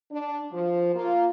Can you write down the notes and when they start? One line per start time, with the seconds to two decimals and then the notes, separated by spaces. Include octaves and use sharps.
0.12 D4
0.52 F3
0.95 A#3 F4